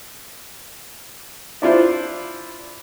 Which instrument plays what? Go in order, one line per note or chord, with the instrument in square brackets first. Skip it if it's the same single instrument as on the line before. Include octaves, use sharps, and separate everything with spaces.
[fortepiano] D4 E4 F4 C5